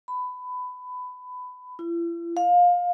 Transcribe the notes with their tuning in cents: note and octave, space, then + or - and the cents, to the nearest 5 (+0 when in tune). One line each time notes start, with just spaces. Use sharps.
B5 +20
E4 +45
F5 +20